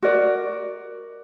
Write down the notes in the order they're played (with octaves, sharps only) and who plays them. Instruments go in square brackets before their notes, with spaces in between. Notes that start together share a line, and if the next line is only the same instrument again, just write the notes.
[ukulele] F#4 A#4 D5